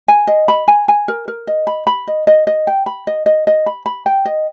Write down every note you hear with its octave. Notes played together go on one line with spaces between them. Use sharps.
G#5
D#5
B5
G#5
G#5
A#4
A#4
D#5
B5
B5
D#5
D#5
D#5
G5
B5
D#5
D#5
D#5
B5
B5
G5
D#5